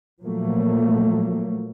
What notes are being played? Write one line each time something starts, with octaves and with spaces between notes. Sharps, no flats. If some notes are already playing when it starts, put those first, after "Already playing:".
A#2 F3 F#3 A3 A#3